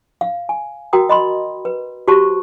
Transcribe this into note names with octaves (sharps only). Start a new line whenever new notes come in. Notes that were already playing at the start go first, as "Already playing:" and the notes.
F5
G#5
F#4 A#4 G5 A#5 D#6
D#5 B5 C6
B4
F#4 G4 C5 A5 C#6